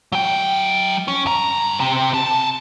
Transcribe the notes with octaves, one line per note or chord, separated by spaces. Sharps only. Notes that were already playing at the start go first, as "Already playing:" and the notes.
F#3 G5
C#4
G2 A#5
C3 C4
C3 A5